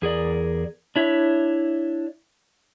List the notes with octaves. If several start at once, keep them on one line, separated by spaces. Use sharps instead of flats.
E2 G#4 A#4 D5
D4 E4 C#5 D#5 E5